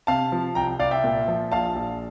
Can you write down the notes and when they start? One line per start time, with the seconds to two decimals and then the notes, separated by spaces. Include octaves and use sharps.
0.07 C3 F5 A5
0.32 F3
0.55 C2 G5 A#5
0.79 C2 D5 F5
0.91 E5 G5
1.04 A#2
1.28 F3
1.52 A#1 F5 A5
1.76 A#1